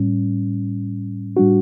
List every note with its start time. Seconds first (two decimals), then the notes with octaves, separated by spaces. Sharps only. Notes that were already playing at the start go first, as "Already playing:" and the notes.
Already playing: A2 G3 C#4
1.37 A2 G3 D4 F#4